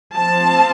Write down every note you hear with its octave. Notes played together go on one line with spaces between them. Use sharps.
F3 C4 A5